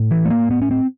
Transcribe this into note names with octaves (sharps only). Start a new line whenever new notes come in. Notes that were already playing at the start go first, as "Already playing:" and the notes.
Already playing: A2
E3
A3
A#3
B3
C#4
C4